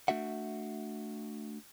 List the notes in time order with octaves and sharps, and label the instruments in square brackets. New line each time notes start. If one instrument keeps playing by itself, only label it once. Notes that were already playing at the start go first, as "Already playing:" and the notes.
[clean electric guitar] A3 D4 F#4 E5 F#5